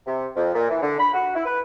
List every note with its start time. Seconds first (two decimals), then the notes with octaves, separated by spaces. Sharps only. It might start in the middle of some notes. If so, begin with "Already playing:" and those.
0.06 C3
0.35 F2
0.54 A#2
0.69 E3
0.81 D3
0.99 B5
1.13 F#4
1.34 E4
1.46 B4